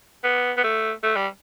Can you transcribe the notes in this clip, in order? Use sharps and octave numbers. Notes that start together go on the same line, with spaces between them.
B3
B3
A3
A3
G3